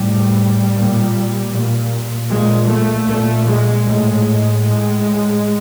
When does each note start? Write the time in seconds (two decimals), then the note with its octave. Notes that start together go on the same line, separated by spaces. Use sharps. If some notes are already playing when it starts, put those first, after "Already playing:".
Already playing: A2 G3
0.73 A#2
1.50 A#2
2.29 A#2 G#3
2.69 A3
3.08 A#2 A3
3.47 G#3
3.87 A2 G#3
4.66 A2